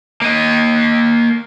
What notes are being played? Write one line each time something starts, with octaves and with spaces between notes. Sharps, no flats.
A#3 D#5